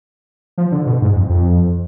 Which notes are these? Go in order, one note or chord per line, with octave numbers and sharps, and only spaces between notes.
F3
D3
B2
G#2
F2
F2